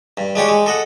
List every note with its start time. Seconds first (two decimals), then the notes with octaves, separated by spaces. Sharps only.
0.17 G2
0.35 G#3 D4 G4 C#5
0.49 G#3
0.66 A4 D#5 F#5